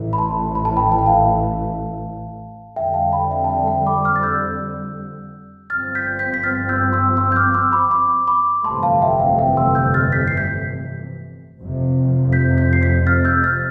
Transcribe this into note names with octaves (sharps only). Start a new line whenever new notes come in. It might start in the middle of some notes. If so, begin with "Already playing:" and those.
Already playing: A1 A2 E3 A3
B5
A5 C6
B5
A5
G5 B5
A5
G5
F5 A5
F2 D3 G3 E5 G5
F5 A5
G5 B5
E5 G5
A5
E5 G5
E5 G5
B5 D6
D6 F6
A6
E6 G6
G1 G2 F3 C4 F6 A6
G6 B6
G6 B6
B6
F6 A6
E6 G6
C6 E6
C6 E6
G6
D6 F6
C6 E6
B5 D6
B5 D6
B5 D6
G1 F2 C3 E3 A3 A5 C6
F5 A5
E5 G5
F5
E5 G5
C6 E6
E6 G6
F6 A6
G6 B6
C7
G6 B6
F1 F2 C3 F3
G6 B6
G6 B6
C7
G6 B6
F6 A6
E6 G6
F6 A6